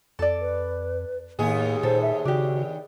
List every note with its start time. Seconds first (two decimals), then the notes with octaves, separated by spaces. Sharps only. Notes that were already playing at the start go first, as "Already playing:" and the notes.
0.19 F2 A4 D5
0.41 B4
1.39 D#2 A2 A#3 B3 G#4
1.83 A#2 A4 C5
2.02 E5
2.25 C#3 D4 F#4 G4